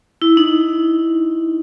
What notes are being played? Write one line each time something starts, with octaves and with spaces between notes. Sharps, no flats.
E4
D#4